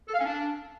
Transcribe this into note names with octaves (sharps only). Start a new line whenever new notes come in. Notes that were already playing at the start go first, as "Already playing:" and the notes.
A4
F5
C#4
D4